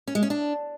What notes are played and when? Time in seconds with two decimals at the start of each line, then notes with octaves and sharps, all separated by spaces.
0.07 C#4
0.15 G#3
0.23 C#4
0.30 D4